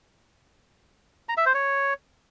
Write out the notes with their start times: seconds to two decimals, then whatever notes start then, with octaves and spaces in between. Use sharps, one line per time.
1.29 A#5
1.37 E5
1.46 C5
1.54 C#5